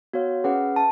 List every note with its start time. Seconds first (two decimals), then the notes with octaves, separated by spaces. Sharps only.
0.13 B3 F#4 C#5 F5
0.44 C#4 G#4 B4 F#5
0.76 A5